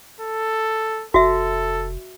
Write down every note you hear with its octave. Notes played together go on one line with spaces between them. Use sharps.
A4
F1 F#4 A4 E5